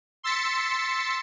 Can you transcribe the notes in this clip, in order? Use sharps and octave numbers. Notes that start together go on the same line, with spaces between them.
C6 E6 A6 B6 C#7